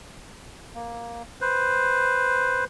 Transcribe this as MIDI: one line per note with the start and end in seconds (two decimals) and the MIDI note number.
0.75 1.23 58
1.41 2.64 71
1.41 2.64 72